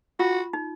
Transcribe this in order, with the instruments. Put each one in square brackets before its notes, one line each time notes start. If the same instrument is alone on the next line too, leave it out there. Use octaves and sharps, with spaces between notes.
[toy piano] F4 [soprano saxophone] F#4
[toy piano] D#4